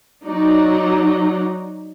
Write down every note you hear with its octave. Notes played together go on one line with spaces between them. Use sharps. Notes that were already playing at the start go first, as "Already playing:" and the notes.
F#3 D#4 D5